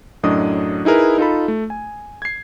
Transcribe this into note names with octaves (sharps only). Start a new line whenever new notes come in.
F#2 A2 F#3 D4 D#5 D#6
D#4 E4 G#4 A#4 B4
D#4 F4 A4 B5
A3
G#5
G#6 C7